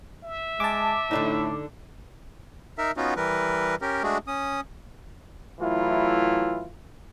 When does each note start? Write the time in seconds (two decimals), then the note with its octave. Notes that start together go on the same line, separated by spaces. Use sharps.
0.24 E5
0.60 G#3 A5 D6
1.11 A2 D3 D4 D#4
2.78 D#4 A#4 E5
2.97 B3 C#4 D#4 F4 F#4
3.17 E3 G3 A#4 B4
3.81 C#4 G4 A#4
4.03 G#3 A3 D4 F#4 G#4
4.27 C#4 D#6
5.60 E3 F#3 A3 E4 F4